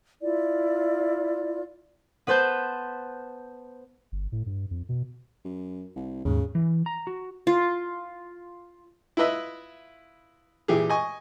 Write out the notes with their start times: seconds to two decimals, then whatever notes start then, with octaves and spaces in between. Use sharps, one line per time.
0.22 E4 F4 D5
2.27 B3 B4 C5 A5 G6
4.12 G1
4.32 A2
4.46 G2
4.71 F2
4.89 B2
5.45 F#2
5.96 C2
6.25 D#2 G#2 C#3
6.55 E3
6.86 A#5
7.07 F#4
7.47 F4
9.17 E4 F4 B4 D#5 E5
10.68 A#2 E3 G4 G#4
10.90 D#5 G#5 C#6